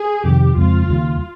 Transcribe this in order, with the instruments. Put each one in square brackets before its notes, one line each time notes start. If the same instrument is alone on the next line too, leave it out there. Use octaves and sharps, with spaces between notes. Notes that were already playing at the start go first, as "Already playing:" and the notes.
Already playing: [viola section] G#4
[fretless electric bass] F2 C3 D#3 [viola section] G4
[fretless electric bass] F2 C#3 G#3 C4 [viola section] F4
[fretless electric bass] D#2 C#3 G3 A#3